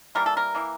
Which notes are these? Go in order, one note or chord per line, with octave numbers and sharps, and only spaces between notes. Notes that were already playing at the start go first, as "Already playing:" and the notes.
E3 G3 A#3 A#4
A4
A#4
E3 A#3